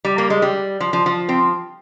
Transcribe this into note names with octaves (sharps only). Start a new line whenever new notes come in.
G3
A#3
G#3
G3
F3
F3
F3
C4